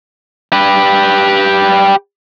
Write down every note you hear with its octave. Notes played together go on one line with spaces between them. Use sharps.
G4 B4